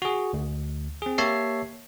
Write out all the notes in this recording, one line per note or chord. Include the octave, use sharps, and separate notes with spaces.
F#4 G#4
D2
C4 G#4
A#3 G4 C#5 E5 A5 C7